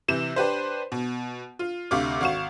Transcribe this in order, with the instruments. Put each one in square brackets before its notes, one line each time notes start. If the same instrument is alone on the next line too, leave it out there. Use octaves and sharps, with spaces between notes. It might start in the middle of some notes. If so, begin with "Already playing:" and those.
[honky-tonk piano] C3 E3 G6 E7
D4 G4 B4 C5
B2
F4
D2 C3 F5 C#6 D6
G#1 F#4 F5 C#6 E7